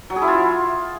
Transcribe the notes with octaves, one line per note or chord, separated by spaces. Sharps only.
F#3
G#4
E4
F4